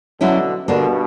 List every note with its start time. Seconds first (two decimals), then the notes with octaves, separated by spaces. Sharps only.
0.20 B2 D3 F#3 C#4 E4
0.68 G2 B2 D3 A#3 D4